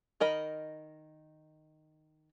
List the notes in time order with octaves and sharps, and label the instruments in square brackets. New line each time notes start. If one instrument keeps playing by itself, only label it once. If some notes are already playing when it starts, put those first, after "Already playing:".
[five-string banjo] D#3 A#4 D#5 B5